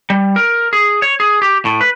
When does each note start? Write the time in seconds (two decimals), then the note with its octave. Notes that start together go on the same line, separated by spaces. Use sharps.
0.10 G3
0.36 A#4
0.73 G#4
1.02 C#5
1.20 G#4
1.42 G4
1.65 A2
1.81 B4